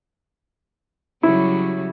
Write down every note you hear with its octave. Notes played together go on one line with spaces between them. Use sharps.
C#3 F#3 G3 E4